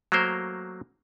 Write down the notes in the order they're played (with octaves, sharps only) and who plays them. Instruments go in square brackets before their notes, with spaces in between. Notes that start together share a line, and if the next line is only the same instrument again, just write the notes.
[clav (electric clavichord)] F#3 A3 A#3 A#4 C5